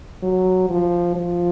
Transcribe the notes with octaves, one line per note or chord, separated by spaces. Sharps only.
F#3
F3
F3